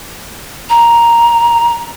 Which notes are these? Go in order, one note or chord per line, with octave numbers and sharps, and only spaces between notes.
A#5